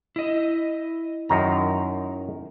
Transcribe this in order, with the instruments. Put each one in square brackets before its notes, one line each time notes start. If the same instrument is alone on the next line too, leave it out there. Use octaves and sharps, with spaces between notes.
[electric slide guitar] E4 D#5
[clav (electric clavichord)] F#2 D#3 A#5